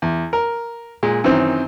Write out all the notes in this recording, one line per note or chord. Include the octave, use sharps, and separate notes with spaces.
E2
A#4
A#2 G#3
F#2 D#3 E3 C4